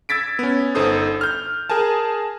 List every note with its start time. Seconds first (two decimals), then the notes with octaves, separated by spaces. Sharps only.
0.09 E6 G#6 A6 B6 D7
0.39 B3 C#4
0.75 G1 D#4 A4 C5 D#6
1.21 F6 G6
1.70 G#4 A#4 G#5 A5